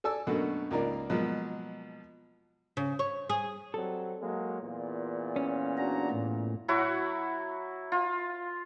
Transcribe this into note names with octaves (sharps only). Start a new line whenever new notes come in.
A4 D5 G#5 A5 E6
F#2 B2 D3 A3 A#3 F#4
C#2 A#3 D#4 F4 A#4 D5
B2 F3 F#3 G#3 A#3
C#3
C#5
G#4
F#3 G3 C4 A4
F#3 G#3 A#3
E2 A#2
C#4
D4 F#4 A#5
A2
F#3 E4 F#4
F4